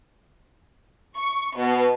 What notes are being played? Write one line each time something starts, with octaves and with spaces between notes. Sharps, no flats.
C#6
B2